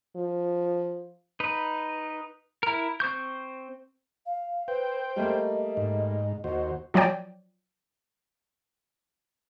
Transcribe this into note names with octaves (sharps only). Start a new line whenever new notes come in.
F3
D#4 B4
E4 A#4
C4 C5 C#6 G6
F5
B4 C5 G5
G3 A3 A#3 D#5
G#2
D#2 F#4 C5 D#5
F3 F#3 C#5 D5 G5